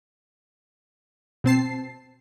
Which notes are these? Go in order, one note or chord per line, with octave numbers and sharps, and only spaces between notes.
B2 C4 A5 C7